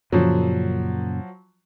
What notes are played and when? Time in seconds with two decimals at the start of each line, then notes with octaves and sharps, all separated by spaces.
0.12 F#2 A#2 C#3 F3 F#3